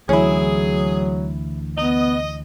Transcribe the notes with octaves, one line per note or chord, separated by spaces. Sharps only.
D2 E3 F#3 C#4 E4 G#4
B3 D#5